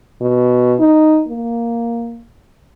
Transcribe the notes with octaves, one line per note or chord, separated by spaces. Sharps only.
B2
D#4
A#3